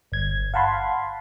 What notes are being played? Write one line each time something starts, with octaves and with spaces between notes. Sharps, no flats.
G1 G#6
F5 F#5 A5 B5 C6